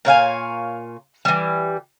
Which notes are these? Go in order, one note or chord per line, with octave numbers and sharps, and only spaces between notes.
A#2 C#5 F5 G#5
E3 G3